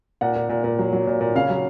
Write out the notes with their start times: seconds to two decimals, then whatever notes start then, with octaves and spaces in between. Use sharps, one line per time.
0.21 A#2 F#5
0.36 A#2
0.49 A#2
0.64 A#2
0.79 F#3
0.93 F#3
1.07 A#2
1.21 A#2
1.35 C#3 F5
1.50 F#3